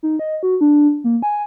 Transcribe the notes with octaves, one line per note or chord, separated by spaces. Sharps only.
D#4
D#5
F#4
D4
A#3
G#5